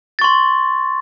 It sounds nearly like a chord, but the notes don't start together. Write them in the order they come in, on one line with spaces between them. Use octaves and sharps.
A6 C#6 C6